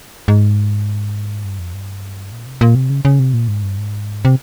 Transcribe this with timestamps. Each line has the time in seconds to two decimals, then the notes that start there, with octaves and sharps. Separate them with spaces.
0.28 G#2
1.45 G2
1.59 F2
1.74 G2
2.32 A#2
2.46 C3
2.61 A#2
2.75 C3
2.90 C#3
3.05 C#3
3.19 C3
3.34 A#2
3.48 G#2
3.63 G2
3.78 G#2
4.25 C3